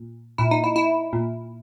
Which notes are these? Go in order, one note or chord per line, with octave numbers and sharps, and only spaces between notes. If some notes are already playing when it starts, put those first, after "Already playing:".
Already playing: A#2
A#2 E4
D#4
E4
E4
A#2